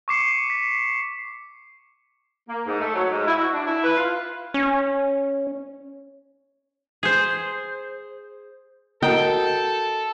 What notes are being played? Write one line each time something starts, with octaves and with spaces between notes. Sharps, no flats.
C#6 D6 C7 C#7
B6
A#3
G#2
A3
F#3
G#2
E4
F#4
D4
E4
B4
F4
C#4
G#4 C5
F#4 A4 A#4 D#5 G5